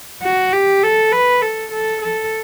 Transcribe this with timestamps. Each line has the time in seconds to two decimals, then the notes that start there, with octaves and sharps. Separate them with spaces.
0.22 F#4
0.53 G4
0.83 A4
1.12 B4
1.42 A4
1.72 A4
2.02 A4